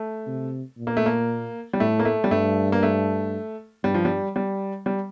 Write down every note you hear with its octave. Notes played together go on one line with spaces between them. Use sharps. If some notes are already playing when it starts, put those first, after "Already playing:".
Already playing: A3
C3
A#2
A#3
A3
A#3
G3
A2 A3
A#3
A3
G3
G2 A3
A#3
A3
G2 G3
F3
G3
G3
G3